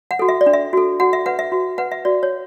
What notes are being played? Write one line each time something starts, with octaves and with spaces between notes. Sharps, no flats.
F#5
F#4 A4
E5
D5
D4
E5
F#4 A4
F#4 F#5
E5
B4 F#5
E5
F#4
B4 F#5
E5
F#4 D5
C#5